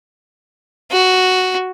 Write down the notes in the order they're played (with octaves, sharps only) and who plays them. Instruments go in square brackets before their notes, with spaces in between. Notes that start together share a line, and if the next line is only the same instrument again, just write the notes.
[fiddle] F#4